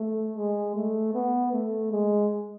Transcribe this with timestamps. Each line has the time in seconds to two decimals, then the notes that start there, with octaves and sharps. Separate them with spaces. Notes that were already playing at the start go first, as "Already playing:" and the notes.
Already playing: A3
0.37 G#3
0.76 A3
1.14 B3
1.53 A3
1.91 G#3